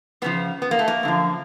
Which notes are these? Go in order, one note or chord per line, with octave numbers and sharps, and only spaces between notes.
E2 C#3 F3 B3
B3
A#3
A3
A#3
F#2 D3 F3